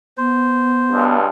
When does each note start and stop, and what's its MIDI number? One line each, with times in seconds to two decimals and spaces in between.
0.18 1.15 59
0.18 1.04 72
0.91 1.27 37
0.91 1.27 43